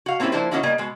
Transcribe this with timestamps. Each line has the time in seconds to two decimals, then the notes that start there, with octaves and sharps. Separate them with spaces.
0.06 F#4 F5
0.20 A#3 C4 C#4 E4 F4 G4
0.32 F3 A#3 D4 E4 G4 C5
0.51 D#3 A#3 C#4 D#4 E4 F#4
0.63 B2 G3 A#3 D#5
0.78 B2 G#3